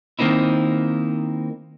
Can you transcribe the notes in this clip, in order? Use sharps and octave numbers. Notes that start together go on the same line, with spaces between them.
D#3 A#3 C4 D#4 E4